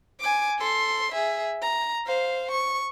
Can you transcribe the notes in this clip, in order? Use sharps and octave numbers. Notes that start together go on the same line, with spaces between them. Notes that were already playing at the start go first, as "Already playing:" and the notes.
G#5 D6
A4 C6
G#4 E5
A#5
C5 F5
C#6